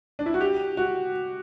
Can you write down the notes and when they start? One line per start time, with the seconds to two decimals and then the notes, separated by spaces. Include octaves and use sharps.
0.19 D4
0.26 E4
0.34 F#4
0.41 G4
0.77 F#4